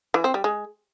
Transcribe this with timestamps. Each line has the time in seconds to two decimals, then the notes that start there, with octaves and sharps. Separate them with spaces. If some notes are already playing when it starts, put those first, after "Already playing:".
0.14 E3
0.24 C4
0.34 G3
0.44 G#3